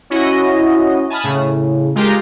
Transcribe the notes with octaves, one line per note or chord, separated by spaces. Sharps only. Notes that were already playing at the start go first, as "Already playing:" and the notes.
C#4 E4 F#4 D#5
G#5 A5 B5 D#6 F6
A2 C#3
G#3 F4 G4 A#4